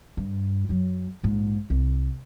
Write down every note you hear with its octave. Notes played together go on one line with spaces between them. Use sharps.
G2
F#2 F#3
A#1 G#2
C2